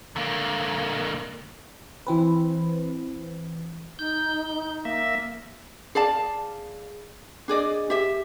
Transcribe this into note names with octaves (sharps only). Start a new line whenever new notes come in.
D3 A#3
E3 C4 B4
D#4 G6
A#3 E5
G#4 D5 F5 A5
D4 G#4 D5 D#5
G4 E5